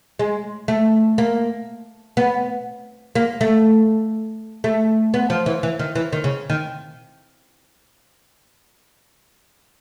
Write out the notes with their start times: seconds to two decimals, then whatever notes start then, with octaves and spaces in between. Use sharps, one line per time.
0.19 G#3
0.68 A3
1.18 A#3
2.17 B3
3.15 A#3
3.41 A3
4.64 A3
5.14 B3
5.30 F3
5.46 E3
5.63 E3
5.79 D#3
5.95 E3
6.13 D#3
6.24 C#3
6.50 D#3